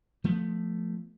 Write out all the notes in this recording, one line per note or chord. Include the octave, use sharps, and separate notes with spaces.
F3 A3 B3